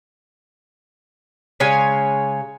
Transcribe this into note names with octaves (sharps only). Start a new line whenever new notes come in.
C#3 G#3 C#5 G#5